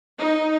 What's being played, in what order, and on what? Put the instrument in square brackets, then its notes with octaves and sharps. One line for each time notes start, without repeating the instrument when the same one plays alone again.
[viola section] D#4